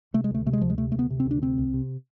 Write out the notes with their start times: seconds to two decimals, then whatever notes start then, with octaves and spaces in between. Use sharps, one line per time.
0.14 C3 A3
0.24 G#3
0.31 D2 A3
0.46 C3 A3
0.53 G#3
0.61 D2 F3
0.70 G#3
0.78 C3 A3
0.92 A3
0.94 D2 B3
1.10 C3
1.20 C4
1.25 D2
1.31 D4
1.42 C3 C4
1.58 C2
1.74 C3